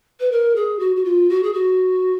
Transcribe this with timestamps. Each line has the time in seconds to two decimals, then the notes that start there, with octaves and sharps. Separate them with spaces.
0.20 B4
0.31 A#4
0.55 G#4
0.79 F#4
0.96 F#4
1.04 F4
1.29 F#4
1.43 G#4
1.53 F#4